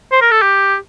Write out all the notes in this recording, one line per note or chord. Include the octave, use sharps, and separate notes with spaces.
C5
A#4
A4
G4